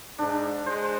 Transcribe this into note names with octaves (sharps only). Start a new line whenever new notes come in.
G#2 D4
G#3 C5